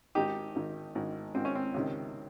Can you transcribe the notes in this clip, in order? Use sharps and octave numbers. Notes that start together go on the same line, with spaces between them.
G#1 G#2 D#3 D#4 G4
G#1 G#2 D#3
G#1 G#2 D#3
G#1 G#2 D#3 C4
C#4
C4
C#2 C3 D#3